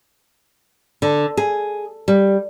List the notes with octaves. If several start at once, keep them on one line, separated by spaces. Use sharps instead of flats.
D3
G#4
G3